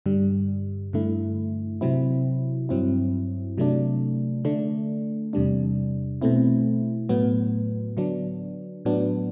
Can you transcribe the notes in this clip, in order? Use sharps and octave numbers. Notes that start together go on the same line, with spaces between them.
G2 D3 G3
G2 D3 A3 E4
C3 F#3 C4 E4
G2 F#3 C4 E4
C3 F#3 A3 D4
D3 A3 D4
E2 C3 G3 D4
B2 A3 C4 E4
A2 F#3 B3
D3 F#3 B3 D4
A2 F#3 B3 D4